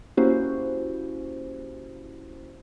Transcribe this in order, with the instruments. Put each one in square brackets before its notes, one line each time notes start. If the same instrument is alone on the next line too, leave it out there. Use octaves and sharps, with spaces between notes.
[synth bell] A#3 C#4 E4 F#4 G4 C5